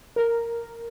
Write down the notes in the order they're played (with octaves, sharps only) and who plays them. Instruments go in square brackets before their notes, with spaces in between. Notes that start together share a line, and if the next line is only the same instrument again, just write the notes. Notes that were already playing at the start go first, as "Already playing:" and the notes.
[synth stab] A#4